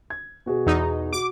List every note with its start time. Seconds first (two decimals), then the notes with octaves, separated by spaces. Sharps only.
0.10 G#6
0.46 B2 F#4 G#4
0.67 E2 D#4
1.13 F#4 D6